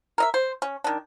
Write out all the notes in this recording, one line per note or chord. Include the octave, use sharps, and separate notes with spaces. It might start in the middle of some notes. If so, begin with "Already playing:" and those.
A#4 D#5 E5
C5
C#4
D#3 D4